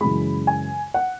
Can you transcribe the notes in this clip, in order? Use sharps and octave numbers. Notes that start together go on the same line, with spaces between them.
F#2 C#3 E3 G#3 B5
G#5
F#5